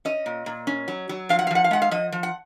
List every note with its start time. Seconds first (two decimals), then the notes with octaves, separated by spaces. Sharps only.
0.05 C#4 D#5
0.26 A#2
0.46 A#2
0.67 C#4
0.88 F#3
1.09 F#3
1.29 F3 F5
1.39 F#5
1.47 F5
1.51 F3 F#5
1.64 F5
1.71 G#3 F#5
1.82 F5
1.91 F3 D#5
2.12 F3
2.23 F#5